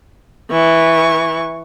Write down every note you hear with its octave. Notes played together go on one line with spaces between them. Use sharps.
E3 C#6